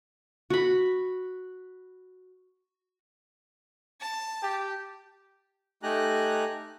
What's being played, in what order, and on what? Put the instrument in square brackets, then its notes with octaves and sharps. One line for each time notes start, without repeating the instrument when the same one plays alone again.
[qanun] F#4 B5
[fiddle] A5
[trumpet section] G4
[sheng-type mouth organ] A3 D#4 G4 G#5 A#5 F#6